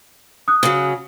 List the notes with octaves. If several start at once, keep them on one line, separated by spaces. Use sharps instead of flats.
D#6 F#6
C#3 F#3